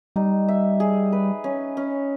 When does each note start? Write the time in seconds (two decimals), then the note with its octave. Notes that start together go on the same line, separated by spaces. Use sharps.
0.16 G3 D#4
0.48 E5
0.80 G#4
1.12 B4
1.44 C#4
1.77 C#4